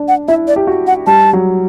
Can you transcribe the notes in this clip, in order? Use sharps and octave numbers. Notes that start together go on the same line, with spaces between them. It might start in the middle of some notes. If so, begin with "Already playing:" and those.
Already playing: D4
F#5
E4 E5
D5
G4
F#4
F#5
G3 A5
F#3